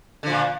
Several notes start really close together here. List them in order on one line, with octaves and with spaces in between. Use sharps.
D3 F3 A#2